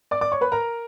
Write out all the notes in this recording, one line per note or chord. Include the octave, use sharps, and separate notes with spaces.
D5 D6
D5 D6
C#5 C#6
B4 B5
A#4 A#5